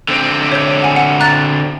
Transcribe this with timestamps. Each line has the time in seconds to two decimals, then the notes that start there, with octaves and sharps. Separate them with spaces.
0.09 D3 C4
0.52 C#5 G6
0.82 F#5 G#5
0.96 F#5
1.20 A#5 F#6 A6